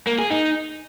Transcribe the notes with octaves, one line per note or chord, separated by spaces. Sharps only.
A#3
G#4
D#4